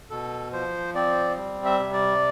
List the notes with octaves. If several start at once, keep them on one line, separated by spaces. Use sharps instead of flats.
B2 A4
F3 C5
C4 D5
G3
E5
C3
D5